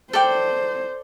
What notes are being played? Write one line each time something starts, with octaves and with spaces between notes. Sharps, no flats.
A4 C5 D5 G5